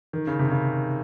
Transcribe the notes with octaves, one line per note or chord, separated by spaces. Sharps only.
D#3
C#3
C3
C#3